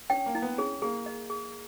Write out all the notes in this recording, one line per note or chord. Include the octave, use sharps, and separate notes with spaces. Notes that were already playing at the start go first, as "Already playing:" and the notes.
C#4 G5
A#3
E4
B3
C#4 G#4
A#3 G#4
D#5
G#4